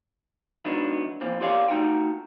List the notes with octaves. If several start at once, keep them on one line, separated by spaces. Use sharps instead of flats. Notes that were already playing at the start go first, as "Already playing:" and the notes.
D#3 F#3 G#3 B3 D4 E4
A#2 E3 F3 C4
F4 G4 C#5 D5 F5 G#5
A3 D#4 F4 F#4 G5